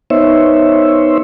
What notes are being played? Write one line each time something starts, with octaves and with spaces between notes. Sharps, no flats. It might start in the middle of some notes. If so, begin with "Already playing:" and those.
B3 D#4 C5 C#5 E5